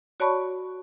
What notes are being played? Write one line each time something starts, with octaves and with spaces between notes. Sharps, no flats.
F#4 C#5 D5 A5 B5 C#6